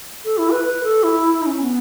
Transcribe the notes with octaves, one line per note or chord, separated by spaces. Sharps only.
A4
E4
B4
B4
A4
E4
D#4
C#4
B3